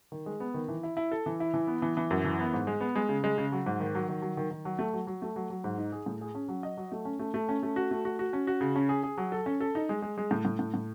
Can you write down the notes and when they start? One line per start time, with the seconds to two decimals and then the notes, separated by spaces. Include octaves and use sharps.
0.12 D#3
0.26 G#3
0.40 B3
0.54 D#3
0.68 E3
0.83 E4
0.97 E4
1.12 A4
1.26 E3
1.40 E4
1.54 E3
1.67 B3
1.82 E3
1.97 E3
2.11 F#2
2.25 E3
2.39 B3
2.53 G#2
2.67 G#3
2.81 B3
2.96 G#3
3.09 C#3
3.24 G#3
3.38 C#3
3.52 F#3
3.66 G#2
3.80 D#3
3.95 F#3
4.09 D#3
4.22 F#3
4.37 D#3
4.51 D#3
4.65 F#3
4.79 A3
4.93 F#3
5.07 F#3
5.22 A3
5.36 F#3
5.50 F#3
5.64 G#2
5.78 D#4
5.92 G#4
6.06 A2
6.21 G#4
6.35 C#4
6.48 F#3
6.63 D#5
6.77 F#3
6.92 A3
7.05 C#4
7.19 A3
7.34 A3
7.49 C#4
7.63 A3
7.76 F#4
7.91 A3
8.05 F#4
8.19 F#4
8.33 C#4
8.47 F#4
8.61 C#3
8.76 C#4
8.89 G#4
9.03 G#4
9.18 F#3
9.32 A4
9.46 C#4
9.61 A4
9.75 D#4
9.89 G#3
10.02 G#3
10.18 G#3
10.31 A2
10.45 A2
10.59 A2
10.74 A2